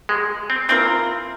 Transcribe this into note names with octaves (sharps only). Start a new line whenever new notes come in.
G#3
C4
E3 A#3 C4 F4 A#4